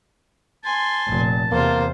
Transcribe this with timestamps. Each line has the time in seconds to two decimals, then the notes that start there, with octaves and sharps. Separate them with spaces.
0.65 G#5 A5 C6
1.07 F1 A#2
1.52 E2 C3 A#3 F4 C5